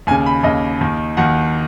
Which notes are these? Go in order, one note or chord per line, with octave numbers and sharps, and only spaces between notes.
D#2 C#3 G#5
B5
D#2 C#3 D#5
D#2 D#3
D#2 D#3 F#5